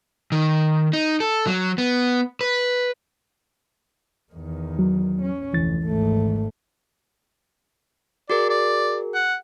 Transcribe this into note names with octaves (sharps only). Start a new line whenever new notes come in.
D#3
D#4
A4
F#3
B3
B4
E2 D#3
F#3
C#4
F1 D2 E3 A6
G#1 A3
F#4 G#4 A#4 D5
D5
F#5